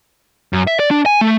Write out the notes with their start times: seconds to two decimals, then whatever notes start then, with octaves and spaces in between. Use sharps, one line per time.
0.53 F#2
0.67 E5
0.80 D5
0.91 D4
1.06 G#5
1.21 A3